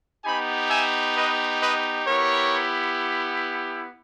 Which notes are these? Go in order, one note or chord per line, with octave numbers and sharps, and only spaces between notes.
B3 D#4 G4 G#5 B5
E5 G#5
B4 D#5
B4 D#5
B3 E4 G4 A#4 C#5